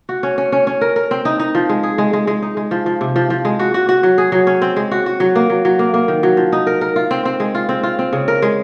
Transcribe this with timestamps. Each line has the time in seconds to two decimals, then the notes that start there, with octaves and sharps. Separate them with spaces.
0.09 F#4
0.23 C#4
0.38 C#4
0.52 C#4
0.67 C#4
0.81 A#4
0.96 A#4
1.11 C4
1.25 D#4
1.40 D#4
1.55 F3
1.69 G#3
1.83 G#4
1.98 G#3
2.13 G#3
2.27 G#3
2.42 D#4
2.57 G#3
2.71 F3
2.86 F3
3.01 C3
3.16 F3
3.30 F3
3.45 G#3
3.59 F#4
3.74 F#4
3.89 F#4
4.03 F#3
4.18 G#4
4.32 F#3
4.47 C#4
4.62 C4
4.76 G#3
4.91 F#4
5.06 F#4
5.20 F#3
5.35 A#3
5.50 F#3
5.65 F#3
5.79 A#3
5.94 A#3
6.08 D#3
6.23 F#3
6.37 F3
6.52 D#4
6.67 A#4
6.81 A#4
6.96 F4
7.11 C4
7.25 C4
7.40 G#3
7.55 F4
7.69 C4
7.83 F4
7.99 C4
8.13 C#3
8.28 A#4
8.42 G#3